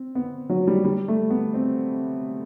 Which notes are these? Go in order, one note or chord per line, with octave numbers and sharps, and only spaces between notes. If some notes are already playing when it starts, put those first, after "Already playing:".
Already playing: C4
B3
F#3
G3
G3
A3
B3
C4